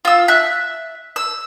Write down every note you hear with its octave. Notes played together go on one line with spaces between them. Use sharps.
F4 E6
E5 F#6
E6